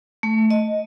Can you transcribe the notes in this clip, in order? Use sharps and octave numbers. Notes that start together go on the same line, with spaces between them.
A3
D#5